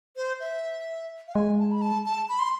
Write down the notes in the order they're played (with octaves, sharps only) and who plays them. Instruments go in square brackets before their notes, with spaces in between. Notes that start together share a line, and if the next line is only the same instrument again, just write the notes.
[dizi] C5
E5
F5
[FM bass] G#3 [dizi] G#5
[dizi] A5
B5
A5
A5
B5
C6